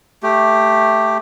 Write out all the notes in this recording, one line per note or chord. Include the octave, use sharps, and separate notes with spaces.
A3 G4